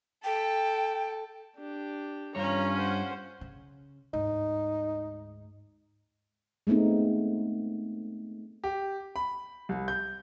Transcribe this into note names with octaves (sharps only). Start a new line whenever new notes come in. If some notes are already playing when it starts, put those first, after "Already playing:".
A4 G5
D4 G4
G2 C#4 F4 C#5 A#5
C5 F#5
C#3
D2 G#2 D#4
G#3 A3 B3 C4 D#4
G4
B5
C2
G6